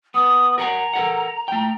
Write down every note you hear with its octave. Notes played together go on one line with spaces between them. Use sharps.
B3 D#6
A#4 F#5 G#5 A#5
A4 A#4 F#5
A3 G5